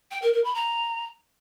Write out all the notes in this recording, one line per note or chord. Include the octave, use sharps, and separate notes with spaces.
G5
A#4
A#4
B5
A#5